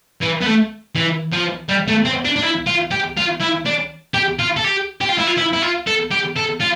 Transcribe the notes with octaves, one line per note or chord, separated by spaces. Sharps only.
E3
B3
A3
E3
F3
G3
A3
C4
D4
D4
E4
F4
G4
F4
E4
D4
G4
F4
A4
G4
G4
F4
E4
F4
E4
E4
F4
A4
G4
A4
F4